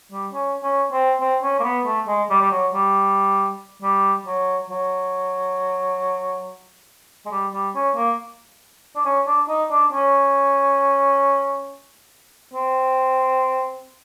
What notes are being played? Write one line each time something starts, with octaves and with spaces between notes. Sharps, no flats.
G3
C#4
C#4
C4
C4
C#4
A#3
B3
A3
G#3
G3
G3
F#3
G3
G3
F#3
F#3
G#3
G3
G3
C#4
A#3
D4
C#4
D4
D#4
D4
C#4
C4